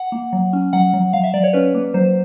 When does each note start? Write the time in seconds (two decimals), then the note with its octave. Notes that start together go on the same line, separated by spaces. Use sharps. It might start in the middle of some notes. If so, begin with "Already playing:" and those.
Already playing: F#5
0.12 A#3
0.33 F#3
0.53 C#4
0.73 F#3 F#5
0.94 F#3
1.13 F#3 F5
1.23 E5
1.34 F#3 D5
1.44 C#5
1.53 C#4 B4
1.74 A#3
1.94 F#3 C5